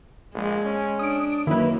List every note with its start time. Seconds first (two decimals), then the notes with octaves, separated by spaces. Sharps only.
0.34 A#1 G#3
0.65 C#4
0.99 D4 D#6 D7
1.47 F#2 D#3 A#3 E4 B4